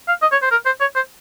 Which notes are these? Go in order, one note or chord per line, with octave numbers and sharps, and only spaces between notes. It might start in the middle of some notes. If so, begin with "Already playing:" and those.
F5
D#5
C#5
C5
A#4
C5
C#5
C5